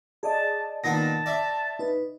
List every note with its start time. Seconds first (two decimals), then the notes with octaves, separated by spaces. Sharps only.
0.23 G#4 D5 D#5 A5
0.84 A#2 D#3 B3 A5 A#6
1.26 D5 E5
1.79 D#4 B4